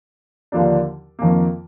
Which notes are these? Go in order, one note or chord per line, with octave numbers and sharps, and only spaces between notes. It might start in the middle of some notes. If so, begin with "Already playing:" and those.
D#2 D3 F3 A#3 D4
F2 D#3 A#3